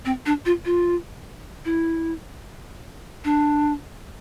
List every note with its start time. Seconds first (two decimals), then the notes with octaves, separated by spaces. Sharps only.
0.05 C4
0.26 D4
0.46 F4
0.65 F4
1.65 E4
3.25 D4